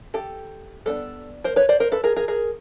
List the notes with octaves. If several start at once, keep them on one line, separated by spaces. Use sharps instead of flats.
G4 A4
G3 B3 D4 A4 B4
A#4 C5
B4 C#5
C5 D5
A#4 C5
A4 B4
G#4 A#4
G#4 A#4
G#4 A#4